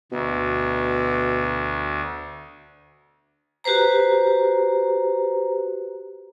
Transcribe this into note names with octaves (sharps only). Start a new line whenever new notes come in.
D2 B2
F#4 G4 B4 C5 A#5